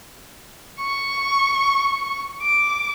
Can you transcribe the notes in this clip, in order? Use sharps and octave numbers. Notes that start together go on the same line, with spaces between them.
C#6
D6